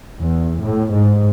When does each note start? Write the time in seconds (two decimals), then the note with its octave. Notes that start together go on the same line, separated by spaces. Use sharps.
0.19 E2
0.61 A2
0.92 G#2